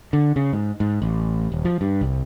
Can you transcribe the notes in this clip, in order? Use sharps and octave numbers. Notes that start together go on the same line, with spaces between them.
D3
C#3
G#2
G#2
A1
D#1
F3
G2
C2